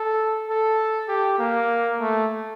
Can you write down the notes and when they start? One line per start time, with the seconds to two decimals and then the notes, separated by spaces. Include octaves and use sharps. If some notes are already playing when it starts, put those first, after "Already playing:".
Already playing: A4
0.48 A4
1.08 G4
1.39 A#3
2.00 A3